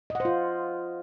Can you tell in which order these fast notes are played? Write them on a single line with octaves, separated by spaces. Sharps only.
D#5 F#5 C5 F4